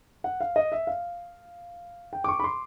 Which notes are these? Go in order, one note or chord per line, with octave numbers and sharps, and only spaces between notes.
F#5
F5
D#5
E5
F5
G5
D6
C#6
B5
C6